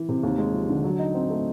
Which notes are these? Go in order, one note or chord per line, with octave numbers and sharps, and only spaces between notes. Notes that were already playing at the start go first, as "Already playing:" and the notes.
Already playing: E3
C3
D#2
G#3
F3
D3
F#3
D#4
C4
A3